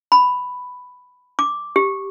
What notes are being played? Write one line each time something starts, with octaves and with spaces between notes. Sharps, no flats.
B5
D6
G4